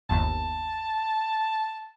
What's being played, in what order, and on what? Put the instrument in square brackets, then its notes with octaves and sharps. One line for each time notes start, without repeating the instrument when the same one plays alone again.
[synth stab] G1 D#2 [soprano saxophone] A5